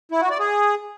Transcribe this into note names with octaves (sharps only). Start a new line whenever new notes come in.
E4
F#4
D5
G#4